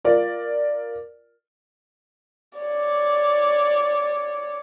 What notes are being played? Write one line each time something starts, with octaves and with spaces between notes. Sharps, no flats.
F4 A#4 D5
C#5 D5